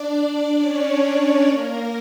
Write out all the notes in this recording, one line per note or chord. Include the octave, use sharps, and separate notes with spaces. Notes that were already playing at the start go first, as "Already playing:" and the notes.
Already playing: D4 D5
C#4 C#5
A#3 A#4